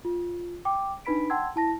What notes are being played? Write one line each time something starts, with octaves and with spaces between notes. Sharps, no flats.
F4
G5 D6
D4 D#4 B4 B5 B6 D7
F#5 G5 A5 C6 E6 G#6
E4 A5 A#6